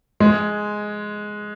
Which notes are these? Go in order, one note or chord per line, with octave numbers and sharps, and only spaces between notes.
G#3